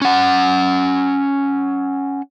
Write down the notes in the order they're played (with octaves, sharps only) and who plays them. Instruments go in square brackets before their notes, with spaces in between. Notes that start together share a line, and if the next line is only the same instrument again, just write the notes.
[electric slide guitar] C#4 F#5